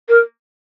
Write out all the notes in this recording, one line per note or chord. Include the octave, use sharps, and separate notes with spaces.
A#4